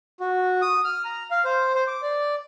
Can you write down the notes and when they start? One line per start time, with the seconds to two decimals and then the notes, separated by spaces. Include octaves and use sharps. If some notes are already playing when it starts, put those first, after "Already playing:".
0.20 F#4
0.62 D#6
0.84 F6
1.05 A#5
1.31 F5
1.45 C5
1.75 C5
1.87 D6
2.02 D5